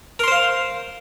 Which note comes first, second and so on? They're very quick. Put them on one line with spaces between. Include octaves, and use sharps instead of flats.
A#4 C6 C5 F5